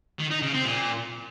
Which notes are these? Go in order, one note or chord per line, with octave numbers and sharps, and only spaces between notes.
D#3
D#4
C#3
C4
A#2